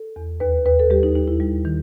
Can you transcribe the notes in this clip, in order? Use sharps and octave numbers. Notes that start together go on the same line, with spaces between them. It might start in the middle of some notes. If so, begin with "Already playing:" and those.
Already playing: A4
E2
D#2 B4
D#2 B4
A4
G3 G4
D#4
D#2 D#4
E4
G3
D#3